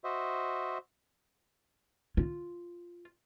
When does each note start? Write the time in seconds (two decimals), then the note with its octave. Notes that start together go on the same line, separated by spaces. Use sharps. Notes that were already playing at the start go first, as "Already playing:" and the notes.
0.04 F#4 C5 D#5 E5
2.17 F4